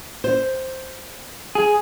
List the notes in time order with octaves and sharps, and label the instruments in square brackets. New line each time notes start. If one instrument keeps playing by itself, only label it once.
[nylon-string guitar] C5
[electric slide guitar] G#4